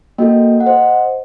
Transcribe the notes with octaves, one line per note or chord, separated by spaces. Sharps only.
A#3 F#4 A4 D#5 G5
F#5
C5 D#5